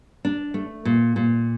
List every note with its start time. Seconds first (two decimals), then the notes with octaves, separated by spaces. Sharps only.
0.25 D4
0.54 A3
0.85 A#2
1.16 A#2